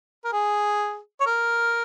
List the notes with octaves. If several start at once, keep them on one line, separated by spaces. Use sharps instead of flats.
A#4
G#4
C#5
A#4